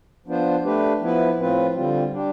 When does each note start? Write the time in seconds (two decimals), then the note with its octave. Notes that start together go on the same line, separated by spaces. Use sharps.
0.26 F3 B3 D4 F4 C5
0.63 A3 D4 G4 B4
1.01 F3 B3 E4 B4
1.37 A2 F3 C4 F4 B4
1.74 D3 G3 C4 F4
2.11 G3 D4 G4